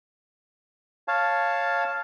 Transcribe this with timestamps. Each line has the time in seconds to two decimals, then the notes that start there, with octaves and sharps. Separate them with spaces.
1.08 C#5 F5 A5